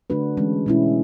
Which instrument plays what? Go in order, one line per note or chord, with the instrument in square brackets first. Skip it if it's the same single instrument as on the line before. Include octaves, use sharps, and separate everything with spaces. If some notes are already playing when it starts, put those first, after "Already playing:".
[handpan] D3 A3 D4 F#4 B4
E3 G#3 C#4
B2 G#3 C#4 E4